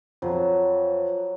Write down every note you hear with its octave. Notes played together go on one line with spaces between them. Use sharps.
F2 F#3